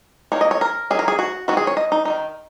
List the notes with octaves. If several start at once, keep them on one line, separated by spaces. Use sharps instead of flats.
D#3 A#3 D#4 C#5
D#5
C#5
A#4
D#3 F#3 C#4 G#4
A#4
G#4
F#4
D#3 G#3 C#4 F#4
G#4
C#5
D#5
D#4
D#3 G#3 D#4